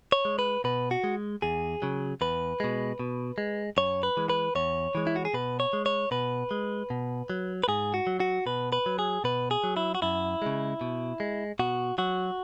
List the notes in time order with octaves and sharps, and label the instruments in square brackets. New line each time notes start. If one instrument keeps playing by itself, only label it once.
[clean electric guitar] C#5
G#3
B4
B2 B4
F#4
G#3
E2 G#4
C#3 F#3
E2 B4
B2 G#3
B2
G#3
F#2 C#5
B4
E3 G#3
B4
E2 C#5
E3 G#3
E4
F#4
G#4
B2 B4
C#5
G#3
C#5
B2 B4
G#3
B2
F#3
B4
G#2 G#4
F#4
F#3
F#4
B2 B4
B4
F#3
G#4
B2 B4
G#4
F#3
E4
F#4
F#2 E4
C#3 G#3
B2
G#3
B2 F#4
F#3 F#4